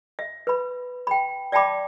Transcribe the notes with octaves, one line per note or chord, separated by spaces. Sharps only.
E5
B4 B5
G5 B5
D5 E5 G5 A5 B5 D6